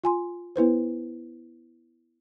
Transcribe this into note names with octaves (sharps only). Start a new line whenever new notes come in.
F4 G#5 C6
B3 E4 B4 C5